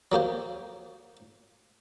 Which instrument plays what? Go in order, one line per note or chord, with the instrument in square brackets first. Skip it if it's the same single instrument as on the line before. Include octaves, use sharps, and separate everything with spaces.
[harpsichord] F#3 A#3 G4 C5